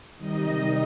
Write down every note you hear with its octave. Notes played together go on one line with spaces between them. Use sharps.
C3 D#3 G3 D#4 D#5